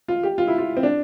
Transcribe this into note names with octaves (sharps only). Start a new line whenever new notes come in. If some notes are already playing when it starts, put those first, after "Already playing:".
F4
G4
F4
E4
F4
C4
D4